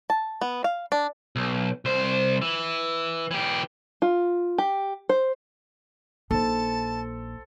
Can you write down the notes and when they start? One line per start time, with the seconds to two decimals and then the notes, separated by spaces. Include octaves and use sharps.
0.10 A5
0.41 B3
0.64 F5
0.92 D4
1.36 B1
1.85 C2 C5
2.42 E3
3.31 E3 G4
4.02 F4
4.58 G4
5.09 C5
6.31 A#1 D#4 A4 C5 A5